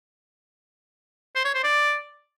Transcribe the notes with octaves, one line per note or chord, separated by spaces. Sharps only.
C5
C#5
C5
D5